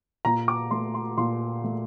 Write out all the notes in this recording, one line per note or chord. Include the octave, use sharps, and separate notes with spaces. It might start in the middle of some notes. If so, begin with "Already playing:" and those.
A#2 A#5
D6
A3 C6
C6
A#2 C6
A3